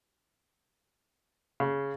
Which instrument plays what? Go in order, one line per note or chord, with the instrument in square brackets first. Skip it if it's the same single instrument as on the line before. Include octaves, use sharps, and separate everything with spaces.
[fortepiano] C#3